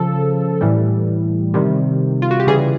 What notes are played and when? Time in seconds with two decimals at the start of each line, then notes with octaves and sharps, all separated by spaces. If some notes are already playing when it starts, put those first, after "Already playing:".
Already playing: C#3 F3 A4
0.61 A2 E3 G3
1.54 C3 D#3 G3
2.22 F4
2.31 F#4
2.40 G4
2.47 C#3 E3 G3 G#4